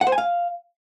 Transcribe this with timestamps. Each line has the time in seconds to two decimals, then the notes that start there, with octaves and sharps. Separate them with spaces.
0.01 F#5
0.07 C5
0.12 G#5
0.18 F5